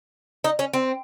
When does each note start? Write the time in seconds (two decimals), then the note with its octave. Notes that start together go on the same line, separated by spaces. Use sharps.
0.44 D#4
0.59 C#4
0.74 C4